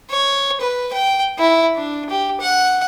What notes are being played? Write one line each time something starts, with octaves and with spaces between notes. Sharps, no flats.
C#5
B4
G5
E4
D4
G4
F#5